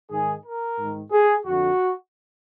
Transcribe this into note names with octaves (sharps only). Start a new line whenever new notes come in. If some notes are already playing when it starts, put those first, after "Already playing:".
G#2 D#3 G#4
A#4
G#2 D#3
G#4
F2 D3 F#4